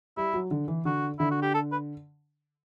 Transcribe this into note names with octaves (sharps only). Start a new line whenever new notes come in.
G3 E4
F#3
D3
E3
D3 F#4
D3 E4
F#4
G4
A4
B4